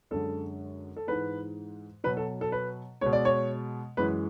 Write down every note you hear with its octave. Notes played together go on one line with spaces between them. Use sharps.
F#2 D3 G#3 A4
A4
G#2 E3 G#3 B4
B2 F#3 B4
A4
A4
B4
B2 G#3 C#5
D5
C#5
F#2 E3 G#3 B4